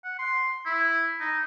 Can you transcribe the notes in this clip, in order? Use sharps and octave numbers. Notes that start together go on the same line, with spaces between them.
F#5
C6
E4
D#4